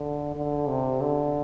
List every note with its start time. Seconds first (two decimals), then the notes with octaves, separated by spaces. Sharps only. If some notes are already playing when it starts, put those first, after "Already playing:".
Already playing: D3
0.36 D3
0.69 C3
1.01 D3